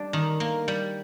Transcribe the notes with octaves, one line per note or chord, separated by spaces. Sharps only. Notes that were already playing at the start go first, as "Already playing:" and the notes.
Already playing: G3 D4
D#3
A#3
G3